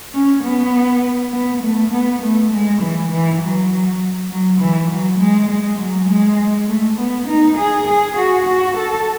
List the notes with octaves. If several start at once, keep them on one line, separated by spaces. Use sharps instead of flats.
C#4
B3
B3
A3
B3
A3
G#3
E3
E3
F#3
F#3
E3
F#3
G#3
G#3
F#3
G#3
A3
B3
D#4
G#4
G#4
F#4
F#4
A4